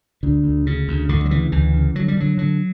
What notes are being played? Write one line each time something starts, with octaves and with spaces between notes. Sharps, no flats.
D2 D3
D2
C#3
D2
D2 D3
F#3
C#3 E3
D2 E3
C#3
D3 F#3
G3
D3 F#3
D3 F#3